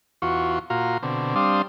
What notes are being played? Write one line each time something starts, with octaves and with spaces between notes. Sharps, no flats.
E2 F4 F#4 C#6
A#2 F4 F#4 F5 A#5
B2 D3 C4
G3 C4 D4 F5 C6 D#6